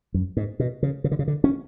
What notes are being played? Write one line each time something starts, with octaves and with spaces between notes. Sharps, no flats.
F#2
G#2
B2
C#3
C#3
D3
C#3
D3
C#4